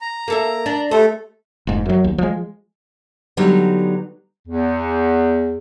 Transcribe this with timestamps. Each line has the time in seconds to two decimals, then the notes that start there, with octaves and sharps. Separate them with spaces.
0.01 A#5
0.28 A#3 A4 E5
0.66 D4
0.91 G3 A3 A4 C5
1.67 F1 G#2
1.86 F#2 F#3
2.04 D#2
2.18 F3 G#3
3.37 D3 F#3 G3 B3 D#4
4.47 E2